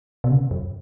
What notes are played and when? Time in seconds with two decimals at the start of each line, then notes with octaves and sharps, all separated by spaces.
0.24 B2
0.30 C#3
0.51 F#2